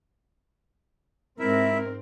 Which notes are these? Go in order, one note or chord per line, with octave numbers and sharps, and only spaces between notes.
G#2 C4 E4 A#4 E5